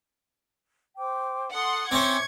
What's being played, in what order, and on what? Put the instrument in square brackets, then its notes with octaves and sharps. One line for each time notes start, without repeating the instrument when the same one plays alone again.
[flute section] C5 G5 D6
[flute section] A4 D#6 [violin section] F#5 C6
[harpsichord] C4 C#4 C5 [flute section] E5 D6 [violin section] C#6 G#6